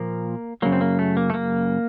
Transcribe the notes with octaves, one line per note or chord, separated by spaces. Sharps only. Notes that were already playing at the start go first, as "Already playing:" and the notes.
Already playing: A#2 F3 A#3
F#2 C#3 F#3 A#3
C4
A#3
A3
A#3
A3
A#3